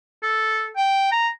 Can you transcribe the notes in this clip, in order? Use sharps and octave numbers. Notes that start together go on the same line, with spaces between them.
A4
G5
A#5